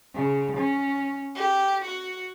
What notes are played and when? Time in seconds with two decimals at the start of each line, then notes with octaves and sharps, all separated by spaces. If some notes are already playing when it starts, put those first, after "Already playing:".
0.14 C#3
0.57 C#4
1.34 G4
1.84 F#4